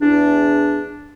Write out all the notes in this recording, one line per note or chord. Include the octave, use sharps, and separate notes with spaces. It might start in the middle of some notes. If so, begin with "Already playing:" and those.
E2 D4